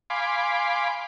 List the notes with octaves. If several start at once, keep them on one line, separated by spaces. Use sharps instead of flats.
F5 G#5 B5 C6 D6